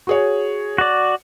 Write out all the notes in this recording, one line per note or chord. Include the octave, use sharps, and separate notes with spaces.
F#4 G#4 C#5
F#4 D5